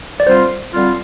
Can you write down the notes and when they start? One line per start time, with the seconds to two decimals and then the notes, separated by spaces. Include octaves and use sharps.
0.20 D5
0.27 D3 G3 C4 F4 C5
0.73 D3 G3 C4 F4